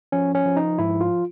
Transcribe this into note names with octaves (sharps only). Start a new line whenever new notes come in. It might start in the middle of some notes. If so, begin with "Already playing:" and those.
F3 C#4
C#4
F3
D#4
G#2 E4
F4